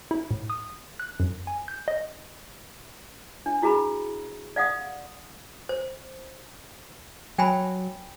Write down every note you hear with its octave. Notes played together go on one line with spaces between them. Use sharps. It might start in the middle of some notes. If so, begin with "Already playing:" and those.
E4
A2
D#6
F#6
F#2
G#5
G6
D#5
D4
E4 F#4 G#4 A#5 B5
D5 F5 F#5 D#6
C5
F#3 G5 G#5 B5